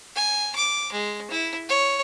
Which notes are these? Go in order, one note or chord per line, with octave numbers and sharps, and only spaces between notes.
G#5
D6
G#3
E4
C#5